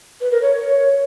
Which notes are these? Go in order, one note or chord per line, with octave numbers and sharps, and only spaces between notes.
B4
A#4
C#5